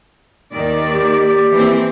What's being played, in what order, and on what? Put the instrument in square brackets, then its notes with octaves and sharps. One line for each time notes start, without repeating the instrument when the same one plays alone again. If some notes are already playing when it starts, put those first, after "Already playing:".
[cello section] D#2 D#3 D5
[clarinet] G4
[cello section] E3 A#3 C4